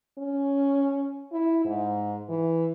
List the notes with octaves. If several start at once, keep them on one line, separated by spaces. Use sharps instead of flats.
C#4
E4
G#2
E3